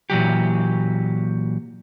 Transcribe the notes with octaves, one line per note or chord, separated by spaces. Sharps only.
A#2 E3 F#3 G4